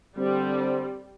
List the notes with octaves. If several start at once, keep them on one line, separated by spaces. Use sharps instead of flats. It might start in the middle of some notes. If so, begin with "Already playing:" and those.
D3 G3 C4